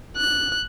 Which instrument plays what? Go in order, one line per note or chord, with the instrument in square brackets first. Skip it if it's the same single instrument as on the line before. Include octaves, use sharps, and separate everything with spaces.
[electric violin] F#6